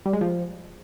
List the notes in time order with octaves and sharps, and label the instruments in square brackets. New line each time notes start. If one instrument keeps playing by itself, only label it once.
[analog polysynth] G3
G#3
F3